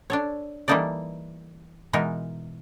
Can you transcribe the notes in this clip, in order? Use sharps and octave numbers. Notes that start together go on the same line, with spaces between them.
D4 A4 C#5
E3 G3 A#3 D#4 A4 D5
B2 E3 G#3 D#4 A#4